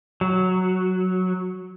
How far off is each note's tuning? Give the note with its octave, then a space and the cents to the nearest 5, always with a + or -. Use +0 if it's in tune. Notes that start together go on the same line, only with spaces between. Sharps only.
F#3 +0